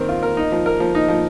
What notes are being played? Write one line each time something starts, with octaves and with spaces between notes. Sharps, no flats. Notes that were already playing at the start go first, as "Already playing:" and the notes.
Already playing: D#3 C4 A#4
F4
A#4
D#4
F3
A#4
F3
D#4
F3